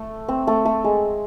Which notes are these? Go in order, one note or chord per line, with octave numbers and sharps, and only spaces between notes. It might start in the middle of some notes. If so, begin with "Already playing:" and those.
Already playing: A3
C4
A3
A3
G#3